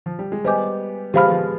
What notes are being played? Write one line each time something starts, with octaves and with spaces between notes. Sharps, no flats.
F3
G3
G#3
G3 B3 C5 D#5 G#5 D6 G6
F3 G#3 G4 C5 F5 B5 F6
B3
F3 G#3